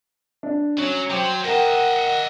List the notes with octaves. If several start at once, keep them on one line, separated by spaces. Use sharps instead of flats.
D4
F#3 C#4
F#3 C5 G5 D6
A#4 D#5 E5 F#5 G5